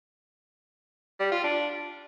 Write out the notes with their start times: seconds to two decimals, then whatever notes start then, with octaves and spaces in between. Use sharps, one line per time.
1.20 G3
1.31 F4
1.43 D4